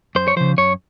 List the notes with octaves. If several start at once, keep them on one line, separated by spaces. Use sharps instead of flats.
F#2 C5
C#5
C#3 F3 C5
F#2 C#5